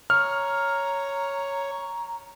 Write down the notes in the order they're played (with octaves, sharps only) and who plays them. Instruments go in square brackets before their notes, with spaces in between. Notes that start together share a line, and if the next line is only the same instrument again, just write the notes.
[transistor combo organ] C#5 [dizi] A#5 [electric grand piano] F6